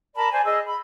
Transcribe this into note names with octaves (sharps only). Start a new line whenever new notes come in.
A#4 D5 A5 B5
C5 D5 G#5
G#4 D5 D#5 E6
B5